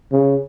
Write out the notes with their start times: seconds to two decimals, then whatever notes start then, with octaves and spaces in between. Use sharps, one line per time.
0.12 C#3